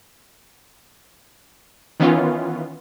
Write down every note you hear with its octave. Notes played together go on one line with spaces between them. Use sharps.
D#3 E3 B3 C#4 F4